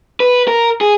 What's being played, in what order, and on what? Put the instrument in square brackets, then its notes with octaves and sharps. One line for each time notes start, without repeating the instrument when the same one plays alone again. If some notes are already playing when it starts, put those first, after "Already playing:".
[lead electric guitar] B4
A#4
G#4